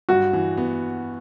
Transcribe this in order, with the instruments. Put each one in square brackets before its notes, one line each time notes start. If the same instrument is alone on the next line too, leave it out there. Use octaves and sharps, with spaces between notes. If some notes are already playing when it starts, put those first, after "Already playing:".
[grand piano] G2 [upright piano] F#4
[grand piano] E3
B3